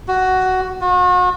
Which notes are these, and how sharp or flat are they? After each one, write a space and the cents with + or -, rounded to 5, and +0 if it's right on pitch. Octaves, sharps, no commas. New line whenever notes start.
F#4 +10
F#4 -40